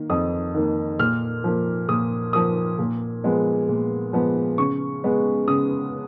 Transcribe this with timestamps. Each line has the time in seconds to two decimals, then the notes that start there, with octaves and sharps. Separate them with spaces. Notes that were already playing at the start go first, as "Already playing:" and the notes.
Already playing: D#3 A#3
0.10 F2 D#6
0.55 D#3 A#3
0.99 A#2 F6
1.44 F3 A#3
1.89 A#2 D#6
2.33 F3 A#3 D#6
2.79 A#2
3.24 F3 G#3 B3
3.69 A#2
4.13 F3 G#3 B3
4.58 C#3 C#6
5.04 G#3 B3
5.48 C#3 D#6